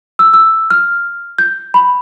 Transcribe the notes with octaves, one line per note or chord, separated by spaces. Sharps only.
E6
E6
F6
G6
B5